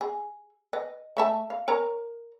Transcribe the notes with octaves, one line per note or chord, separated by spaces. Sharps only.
G#4
B4 D#5
A3 E5 A5
F5
A#4 C#5 A#5